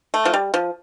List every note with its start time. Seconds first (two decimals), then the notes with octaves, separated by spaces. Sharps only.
0.14 A3
0.25 F3
0.33 G3
0.54 F3